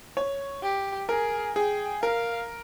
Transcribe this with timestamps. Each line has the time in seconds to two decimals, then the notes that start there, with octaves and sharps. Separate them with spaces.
0.17 C#5
0.63 G4
1.09 G#4 A#4
1.56 G#4 G5
2.03 A#4 F5